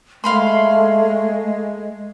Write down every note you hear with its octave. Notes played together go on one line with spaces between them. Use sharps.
G#3 A3 F5 B5 C6